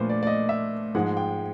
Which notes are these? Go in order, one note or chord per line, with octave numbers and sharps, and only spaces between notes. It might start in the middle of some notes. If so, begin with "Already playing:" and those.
Already playing: A#2 F3 A3 D4 F4 B4 C5
D5
D5
D#5
E5
G#2 F3 G#3 F#5
G5